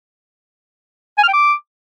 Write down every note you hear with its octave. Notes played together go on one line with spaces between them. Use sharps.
G#5
F6
G5
D6